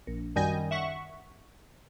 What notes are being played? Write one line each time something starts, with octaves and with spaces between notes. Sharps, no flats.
A#1
F#2 D#3 G3 G#5 G6 A#6
E5 F#5 C#6